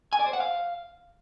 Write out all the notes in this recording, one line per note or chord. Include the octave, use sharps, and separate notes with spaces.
G#5
D5
C5
F#5
F5